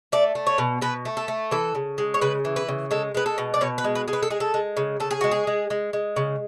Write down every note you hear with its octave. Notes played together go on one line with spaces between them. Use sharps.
A3 D5
A3
C#5
B2
B2 B4
A3
A4
A3
E3 A4
C#3
G#3
C#5
C#3 B4
E3
B4
C#3
G#3 A4
G#3 B4
A4
B2
D5
B2 C#5
B4
G#3
B4
G#3
B4
A4
G#3 G#4
A4
G#3
C#3
C#3 A4
G#4
G#3 F#4
G#4
G#3
G#3
G#3
C#3